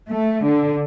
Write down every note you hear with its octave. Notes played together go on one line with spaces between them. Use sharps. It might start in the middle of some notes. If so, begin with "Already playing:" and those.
A3
D3